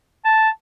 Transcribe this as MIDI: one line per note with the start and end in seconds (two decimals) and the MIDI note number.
0.25 0.49 81